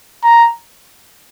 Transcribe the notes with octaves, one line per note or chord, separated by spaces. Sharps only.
A#5